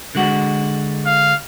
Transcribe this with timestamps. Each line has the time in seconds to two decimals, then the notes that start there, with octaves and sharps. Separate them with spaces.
0.15 D3 G#3 F#4
1.05 F5